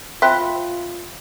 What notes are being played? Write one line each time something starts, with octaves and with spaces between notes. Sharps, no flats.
C4 F4 E5 G5 B5 F#6 B6